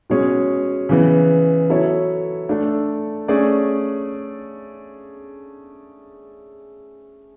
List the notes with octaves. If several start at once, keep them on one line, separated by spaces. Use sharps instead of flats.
B2 G#3 C#4 G#4 C#5
C#3 E3 B3
F#3 B3 E4 A4 C#5
A3 D4 A4
A3 C#4 G#4 D5